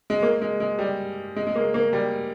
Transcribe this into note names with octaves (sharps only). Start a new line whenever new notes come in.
G#3
A#3
G#3
G#3
G3
G#3
G#3
A#3
A#3
G3